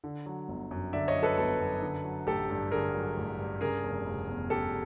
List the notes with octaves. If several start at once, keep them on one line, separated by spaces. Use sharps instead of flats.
D3
F#3
G1
F#2
D3 D5 E5
C#5 D#5
F#3
A4 B4
G1 A4 B4
F#2
D3
F#3
A1 G4 A4
G2
D3 G#4 A#4
F#3
A1
G2
C#3 G#4 A#4
F1
F1
E2
C#3 G4 A4